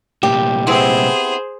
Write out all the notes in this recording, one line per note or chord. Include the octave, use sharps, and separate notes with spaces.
C2 A#2 G4
B3 C4 E4 G#4 C5